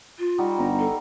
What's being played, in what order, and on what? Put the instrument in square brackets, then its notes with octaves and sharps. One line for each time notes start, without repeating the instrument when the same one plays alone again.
[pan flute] F4
[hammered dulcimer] G3 D#4 F#4
[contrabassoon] G1 [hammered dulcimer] A#5
[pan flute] A4